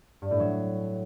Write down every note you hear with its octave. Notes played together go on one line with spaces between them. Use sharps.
G2
A2
F#3